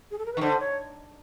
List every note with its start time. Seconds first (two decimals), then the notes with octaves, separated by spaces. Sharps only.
0.11 G#4
0.18 A4
0.26 A#4
0.33 B4
0.37 D#3
0.41 D3 C5
0.60 C#5